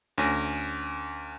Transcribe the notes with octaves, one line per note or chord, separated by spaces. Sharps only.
D2 C#4 A#6 D#7